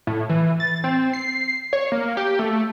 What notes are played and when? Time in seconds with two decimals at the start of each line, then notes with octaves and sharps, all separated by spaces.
0.07 A2
0.29 E3
0.60 A6
0.84 C4
1.13 C7
1.73 C#5
1.92 A#3
2.17 G4
2.39 A3